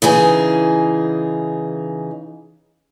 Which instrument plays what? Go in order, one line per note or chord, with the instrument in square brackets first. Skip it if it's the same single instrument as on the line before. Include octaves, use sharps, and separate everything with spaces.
[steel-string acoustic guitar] C#3 E3 D#4 G#4